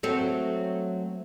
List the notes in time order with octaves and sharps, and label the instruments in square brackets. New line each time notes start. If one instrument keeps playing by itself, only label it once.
[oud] F#3 A3 C4